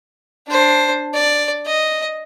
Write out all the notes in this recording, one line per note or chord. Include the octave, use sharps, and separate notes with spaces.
D4 C5
D5
D#5